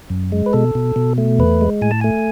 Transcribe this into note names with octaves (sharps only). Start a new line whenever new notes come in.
F#2
G#3
B4
B2 A4
B2
B2
A3
E2 B4
G#3
A2 G#5
A5
A3 G#5